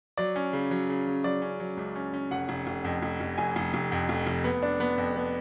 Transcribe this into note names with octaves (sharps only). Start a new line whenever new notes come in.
F#3 D5
C#4
C#3
F#3
C#3
C#3
F#3 D5
C#4
F#3
C#2
C#4
C#4
F1 F#5
F1
F1
F2
F1
F1
F1 G#5
F1
F1
F2
F1
F1
B3
D4
B3
F2
B3